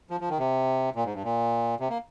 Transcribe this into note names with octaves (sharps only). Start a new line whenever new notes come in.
F3
F3
D#3
C3
A#2
G#2
G2
A#2
C3
A#3